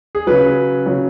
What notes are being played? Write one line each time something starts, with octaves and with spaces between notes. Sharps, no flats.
G#4
C#3 F#3 B4
C#3 F#3